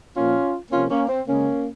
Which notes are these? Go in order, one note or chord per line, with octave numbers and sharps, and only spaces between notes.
A#2 F3 A#3 C#4 F4
C3 F3 A#3 C#4 F4
A#3 C#4
C4
C#3 G#3 A#3 C#4